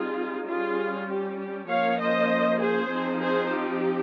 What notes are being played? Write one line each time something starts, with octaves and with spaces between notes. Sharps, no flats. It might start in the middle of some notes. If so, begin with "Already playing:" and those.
Already playing: G3 C4 D#4 F4 G#4
G3 C#4 F4 G#4
G4
G4
F3 A#3 C#4 C#5 F5
C5 D#5
G#4 C5
F3 C4 D#4
G#4 C5
G4